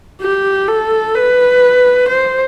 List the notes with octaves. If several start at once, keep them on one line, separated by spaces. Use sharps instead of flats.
G4
A4
B4
C5